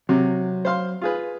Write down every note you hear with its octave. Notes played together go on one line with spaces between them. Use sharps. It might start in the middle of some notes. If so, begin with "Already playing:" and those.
C3 F#3
C5 F5 C6
F4 G#4 B4